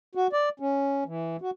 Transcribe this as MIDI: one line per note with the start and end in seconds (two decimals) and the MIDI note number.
0.15 0.27 66
0.33 0.49 74
0.60 1.04 61
1.06 1.37 52
1.41 1.51 66